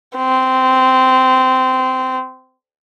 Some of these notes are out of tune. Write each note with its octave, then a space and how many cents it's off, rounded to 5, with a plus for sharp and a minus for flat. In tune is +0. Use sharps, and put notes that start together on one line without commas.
C4 -15